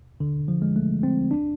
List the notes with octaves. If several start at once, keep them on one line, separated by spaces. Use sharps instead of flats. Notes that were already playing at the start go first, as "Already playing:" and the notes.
D3
F3
G#3
A3
C4
D4